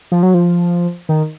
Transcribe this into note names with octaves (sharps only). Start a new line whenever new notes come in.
F3
F#3
F3
D#3